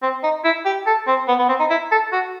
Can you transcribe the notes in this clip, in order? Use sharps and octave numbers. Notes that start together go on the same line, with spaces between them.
C4
D#4
E4
G4
A4
C4
B3
B3
C4
D#4
E4
A4
F#4